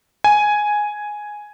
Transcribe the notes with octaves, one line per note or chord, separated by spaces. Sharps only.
G#5